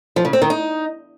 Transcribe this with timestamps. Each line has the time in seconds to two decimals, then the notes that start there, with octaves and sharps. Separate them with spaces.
0.16 F3
0.25 C#3
0.33 C4
0.42 D#3
0.50 D#4